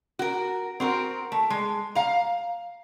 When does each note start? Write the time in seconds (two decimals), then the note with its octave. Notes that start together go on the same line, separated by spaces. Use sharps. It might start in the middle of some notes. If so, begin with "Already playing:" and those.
0.19 F#4 A#4
0.80 C4 F#4 A#4
1.32 A3
1.50 G#3
1.95 F5 A#5